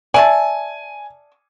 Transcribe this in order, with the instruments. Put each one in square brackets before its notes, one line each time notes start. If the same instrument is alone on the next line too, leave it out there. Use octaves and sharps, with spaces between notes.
[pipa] D5 E5 A5 [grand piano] G#5